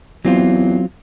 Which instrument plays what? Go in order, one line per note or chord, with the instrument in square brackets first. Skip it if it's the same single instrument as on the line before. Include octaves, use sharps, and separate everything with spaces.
[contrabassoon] E2 [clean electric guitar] F#3 C4 F4